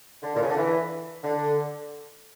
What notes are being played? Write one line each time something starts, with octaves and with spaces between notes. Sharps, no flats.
D3
A#2
C#3
D3
E3
D3